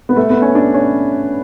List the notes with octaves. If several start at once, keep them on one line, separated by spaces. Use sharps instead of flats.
B3
A3
B3
C#4
D4
C#4